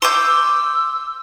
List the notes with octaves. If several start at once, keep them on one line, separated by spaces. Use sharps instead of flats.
C6 D6 E6 G6